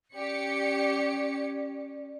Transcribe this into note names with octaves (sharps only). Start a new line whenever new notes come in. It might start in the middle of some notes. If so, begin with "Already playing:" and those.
C#4 G4 D5 C#7